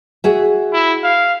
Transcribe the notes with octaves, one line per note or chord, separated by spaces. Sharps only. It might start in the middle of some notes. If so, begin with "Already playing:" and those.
F#4 G#4 E5
E4
F5